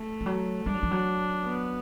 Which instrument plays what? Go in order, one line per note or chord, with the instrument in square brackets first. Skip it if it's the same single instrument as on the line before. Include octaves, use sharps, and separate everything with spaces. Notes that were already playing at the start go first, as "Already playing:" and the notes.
Already playing: [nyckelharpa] A3
[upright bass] F3
F#3
[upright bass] G3 [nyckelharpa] D4
[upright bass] F#3
F3
F#3
[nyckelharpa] B3